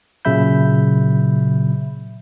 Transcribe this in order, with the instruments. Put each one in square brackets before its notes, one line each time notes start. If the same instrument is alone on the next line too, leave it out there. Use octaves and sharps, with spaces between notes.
[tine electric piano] A#2 C#3 F#3 E5 B5 G6